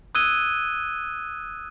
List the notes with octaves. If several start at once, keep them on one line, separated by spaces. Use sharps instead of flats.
D#6 E6 F#6 G#6 D#7 G7